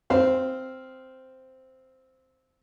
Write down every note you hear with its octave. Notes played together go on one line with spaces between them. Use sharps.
C4 C5 F5